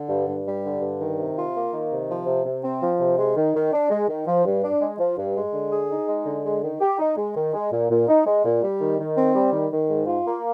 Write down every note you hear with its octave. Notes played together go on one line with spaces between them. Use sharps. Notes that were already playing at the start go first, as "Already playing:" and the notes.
Already playing: D3
G2
G2
G3
D3
G2
D#3
C3
F4
A#3
D#3
C3
F3
C3
C3
C4
F3
C3
G#3
D#3
D#3
D4
G#3
D#3
F3
G2
D4
G#3
F3
G2
G#3
D3
G#4
D#4
G#3
D3
G#3
D#3
G4
D#4
G#3
D#3
G#3
A#2
A#2
D#4
G#3
A#2
G3
D#3
D#3
C4
G3
D#3
D#3
G#2
F4
A#3